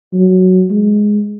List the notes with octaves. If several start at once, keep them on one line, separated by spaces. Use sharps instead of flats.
F#3
G#3